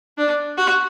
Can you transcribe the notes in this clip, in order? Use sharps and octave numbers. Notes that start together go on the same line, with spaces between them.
D4
F#4